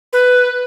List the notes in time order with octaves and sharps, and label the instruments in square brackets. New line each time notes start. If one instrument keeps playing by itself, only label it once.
[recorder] B4